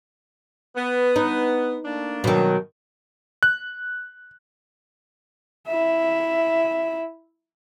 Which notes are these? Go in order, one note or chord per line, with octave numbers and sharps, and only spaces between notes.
B3 B4
D#4
A3 A#3 D4
B2 D#3 F#3
F#6
E4 E5